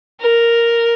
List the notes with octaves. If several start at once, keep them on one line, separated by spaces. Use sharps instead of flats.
A#4